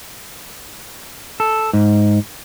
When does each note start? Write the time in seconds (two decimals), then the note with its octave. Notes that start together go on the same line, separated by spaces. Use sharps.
1.40 A4
1.73 G#2